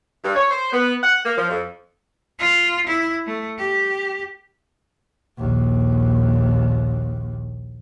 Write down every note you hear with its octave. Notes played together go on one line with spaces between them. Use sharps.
G2
C#5
C5
B3
F#5
A#3
F3
F2
F4
E4
A3
G4
A#1 D#2